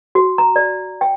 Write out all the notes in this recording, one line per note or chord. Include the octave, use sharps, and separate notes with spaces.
F#4
A#5
D5
G5